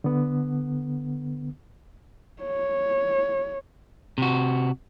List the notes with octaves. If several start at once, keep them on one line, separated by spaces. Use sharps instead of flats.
D3 B3
C#5
C3 F#4